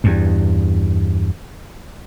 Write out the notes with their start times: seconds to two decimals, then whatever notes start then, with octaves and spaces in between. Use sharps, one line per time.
0.04 E2 G2